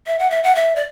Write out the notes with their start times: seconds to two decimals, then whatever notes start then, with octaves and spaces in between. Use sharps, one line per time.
0.07 E5
0.19 F#5
0.30 E5
0.43 F#5
0.55 E5
0.76 D5